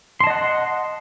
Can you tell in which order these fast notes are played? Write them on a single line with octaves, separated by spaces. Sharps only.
C6 A5 D#5 F#5